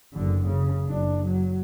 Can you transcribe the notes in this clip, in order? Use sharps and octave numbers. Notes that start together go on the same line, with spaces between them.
F#1 D3
C#3
F#1 D4
F#3